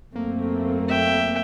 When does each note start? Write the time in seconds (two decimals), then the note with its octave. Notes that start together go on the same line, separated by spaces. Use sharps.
0.16 F#2 A3 A#3 C4
0.88 E5 G5